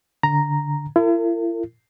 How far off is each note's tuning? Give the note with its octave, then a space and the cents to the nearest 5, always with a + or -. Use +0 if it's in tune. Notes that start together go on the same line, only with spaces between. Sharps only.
D3 -10 A#5 +0
E4 +45 A#4 -45